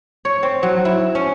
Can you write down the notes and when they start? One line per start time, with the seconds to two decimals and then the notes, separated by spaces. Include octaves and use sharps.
0.25 C#5
0.43 C4
0.63 F#3
0.85 E4
1.15 C#4